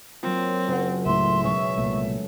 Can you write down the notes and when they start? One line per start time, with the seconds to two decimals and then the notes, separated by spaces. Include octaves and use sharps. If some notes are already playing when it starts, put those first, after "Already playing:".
0.23 F#3 A#3 C4 F4
0.68 F#1 F#5
1.06 C#2 A2 E5 C6
1.43 B2 G#3 C#4 C#6
1.78 C2 A#2 A3